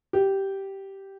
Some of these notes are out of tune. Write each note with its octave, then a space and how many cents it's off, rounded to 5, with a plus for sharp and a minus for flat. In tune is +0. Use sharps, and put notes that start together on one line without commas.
G4 -10